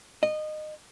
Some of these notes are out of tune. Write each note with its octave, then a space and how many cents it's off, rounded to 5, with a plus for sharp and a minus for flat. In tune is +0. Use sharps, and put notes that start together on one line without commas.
D#5 -20